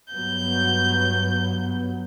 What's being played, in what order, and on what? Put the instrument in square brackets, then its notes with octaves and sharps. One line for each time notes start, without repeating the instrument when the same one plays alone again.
[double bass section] G2 F#3 B3 [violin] G6